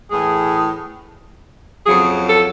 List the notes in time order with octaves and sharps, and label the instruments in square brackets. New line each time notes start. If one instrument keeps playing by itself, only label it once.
[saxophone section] A2 E3 G#4
F2 C#3 F#3 G#4
A4